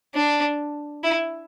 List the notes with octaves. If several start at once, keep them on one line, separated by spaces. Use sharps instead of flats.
D4
E4